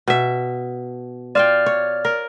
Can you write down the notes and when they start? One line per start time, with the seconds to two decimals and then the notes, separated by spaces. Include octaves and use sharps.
0.08 B2 E5
1.35 F4 D5 F5 G5 F6
1.66 C#5
2.05 A#4